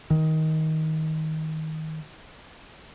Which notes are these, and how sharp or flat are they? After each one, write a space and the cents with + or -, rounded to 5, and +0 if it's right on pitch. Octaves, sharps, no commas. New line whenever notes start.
D#3 +20